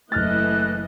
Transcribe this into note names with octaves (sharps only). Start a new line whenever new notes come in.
F#1 E3 A3 E4 D#5 F6 F#6 A6